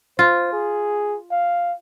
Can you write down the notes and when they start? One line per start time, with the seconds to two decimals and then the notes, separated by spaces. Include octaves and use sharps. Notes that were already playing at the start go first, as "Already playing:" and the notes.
0.19 F4 C5
0.53 G#4
1.31 F5